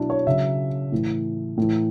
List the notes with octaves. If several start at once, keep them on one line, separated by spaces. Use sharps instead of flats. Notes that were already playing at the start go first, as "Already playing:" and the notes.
Already playing: B2 F#3 D4 E4
C#5
C#3 F#3 E5
A2 E3
A2 E3